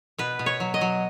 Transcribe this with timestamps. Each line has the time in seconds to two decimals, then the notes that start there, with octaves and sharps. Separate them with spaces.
0.18 B2 B4
0.39 B2
0.46 C#5
0.60 F#3
0.74 D#5
0.81 F#3